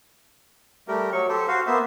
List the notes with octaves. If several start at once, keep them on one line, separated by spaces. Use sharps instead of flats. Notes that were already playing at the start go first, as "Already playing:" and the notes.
G3 A3 G4 A#4
F#3 C#6
G4 A4 C5
F#4 C5 F5
A#3 B3 C5 E5